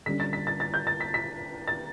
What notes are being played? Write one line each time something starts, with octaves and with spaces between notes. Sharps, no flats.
D3 G3 C#4 B6
A6
B6
A6
A6
G6
A6
B6
B6
A6